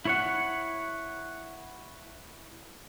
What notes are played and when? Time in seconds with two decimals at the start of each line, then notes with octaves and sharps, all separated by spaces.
0.05 E4 C#5 F#5